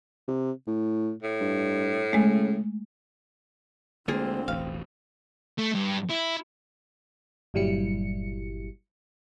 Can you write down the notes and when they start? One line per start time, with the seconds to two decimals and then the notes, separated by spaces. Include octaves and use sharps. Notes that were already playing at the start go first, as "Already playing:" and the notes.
0.28 C3
0.67 A2
1.23 A2
1.40 G2
2.13 C#3 G#3 A3
4.08 D2 D3 G#3 A#3 C4 F4 G#4
4.48 E1 A1 F5
5.58 A3
5.74 G2
6.09 E4
7.54 G1 A#2 F#3 G3 E4 C#7